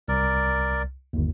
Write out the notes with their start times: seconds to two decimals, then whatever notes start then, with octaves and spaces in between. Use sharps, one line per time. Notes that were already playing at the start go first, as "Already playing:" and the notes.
0.08 C2 A#4 D5
1.13 G1 D#2